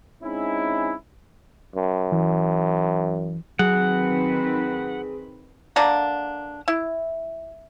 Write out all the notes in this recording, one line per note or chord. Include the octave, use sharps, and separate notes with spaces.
G#3 C4 C#4 D#4 E4
F#2
E3
D#3 F#3 C4 G#4 B4 F#5
D3 A#3 D4 A#5
E4